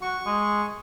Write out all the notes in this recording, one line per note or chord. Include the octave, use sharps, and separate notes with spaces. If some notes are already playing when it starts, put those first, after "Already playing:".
F#4 C#6
G#3